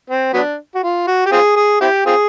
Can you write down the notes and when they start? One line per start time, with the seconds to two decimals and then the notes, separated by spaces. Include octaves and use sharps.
0.10 C4
0.33 F#3 B3 D4
0.75 F#4
0.83 F4
1.08 F#4
1.26 G4
1.32 C4 F4 G#4
1.56 G#4
1.81 C4 E4 G4
2.06 C4 F4 G#4